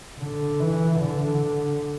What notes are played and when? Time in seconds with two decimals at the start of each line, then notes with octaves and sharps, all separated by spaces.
0.19 D3
0.60 E3
1.00 D3